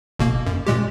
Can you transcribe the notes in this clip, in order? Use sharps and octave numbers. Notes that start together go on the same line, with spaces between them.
G1 B2 A#3
F#2
A#2 G#3 G4